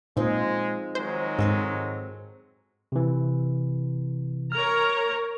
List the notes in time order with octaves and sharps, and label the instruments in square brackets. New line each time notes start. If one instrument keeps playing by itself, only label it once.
[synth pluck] A#2 [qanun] F3 C4 D#4 [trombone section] G#3
[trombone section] D#3 F#3 G#3 [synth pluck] C5
[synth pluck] G#2 [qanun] C4 G#4 A4
[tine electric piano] C3 E3
[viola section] A#4 C#5 A#5 [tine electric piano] F6